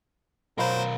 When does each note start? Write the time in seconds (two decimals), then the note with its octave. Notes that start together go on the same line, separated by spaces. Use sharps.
0.58 B1 F#3 A#4 C5 F5 B5